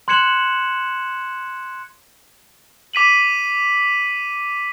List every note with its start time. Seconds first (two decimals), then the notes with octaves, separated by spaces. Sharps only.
0.08 C6 F#6 G#6 C#7 E7 F#7
2.93 D6 B6 D#7 F#7